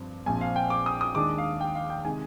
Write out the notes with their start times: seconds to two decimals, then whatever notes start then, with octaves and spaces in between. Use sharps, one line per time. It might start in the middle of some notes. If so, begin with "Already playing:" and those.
Already playing: G2 F3 C4
0.26 A#1 A#2 F3 C4 G#5
0.41 F5
0.56 G5
0.70 D6
0.86 D#6
1.01 D#6
1.15 D#2 D#3 G#3 D4 D6
1.38 F5
1.61 G5
1.75 F5
1.90 G5
2.05 C3 D#3 G#3 G#5